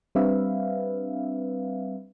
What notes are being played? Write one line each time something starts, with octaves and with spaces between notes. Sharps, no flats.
G3 C4 D4 B4 E5 F5